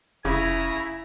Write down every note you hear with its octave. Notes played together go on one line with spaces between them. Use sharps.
F1 C#3 E4 G#5 A#5